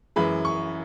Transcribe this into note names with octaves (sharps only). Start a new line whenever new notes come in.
F#2 E3 G#3 B5
C#6